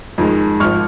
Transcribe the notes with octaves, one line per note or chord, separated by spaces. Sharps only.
F2 D#3 G#3
G#1 F3 C#6 F6